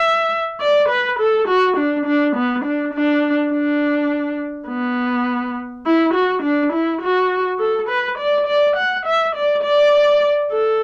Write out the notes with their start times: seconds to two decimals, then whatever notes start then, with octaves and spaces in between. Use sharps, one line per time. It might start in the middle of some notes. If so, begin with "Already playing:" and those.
Already playing: E5
0.60 D5
0.89 B4
1.19 A4
1.48 F#4
1.76 D4
2.05 D4
2.35 B3
2.64 D4
2.93 D4
3.52 D4
4.68 B3
5.85 E4
6.14 F#4
6.43 D4
6.73 E4
7.01 F#4
7.59 A4
7.88 B4
8.18 D5
8.47 D5
8.76 F#5
9.05 E5
9.35 D5
9.63 D5
10.51 A4